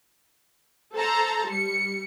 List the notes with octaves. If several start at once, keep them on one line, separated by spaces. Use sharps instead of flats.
A4 C5 A5 A#5
G3 C#7